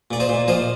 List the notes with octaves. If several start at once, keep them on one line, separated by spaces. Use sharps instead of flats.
A#2 D5
C5 D#5
A#2
F3 C5 D#5